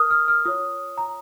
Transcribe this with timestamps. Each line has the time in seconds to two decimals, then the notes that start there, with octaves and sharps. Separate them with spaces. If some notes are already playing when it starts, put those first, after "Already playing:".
Already playing: A#4 D#6 F6
0.11 F6
0.28 F6
0.45 F4 C#5 D#6
0.98 A#5